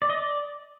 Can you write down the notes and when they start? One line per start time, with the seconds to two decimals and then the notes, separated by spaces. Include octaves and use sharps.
0.02 D5
0.10 D#5
0.17 D5